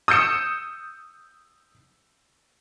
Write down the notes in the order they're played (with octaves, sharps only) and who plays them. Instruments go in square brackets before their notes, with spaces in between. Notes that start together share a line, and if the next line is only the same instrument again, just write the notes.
[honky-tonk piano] D#6 E6 G6 C#7 E7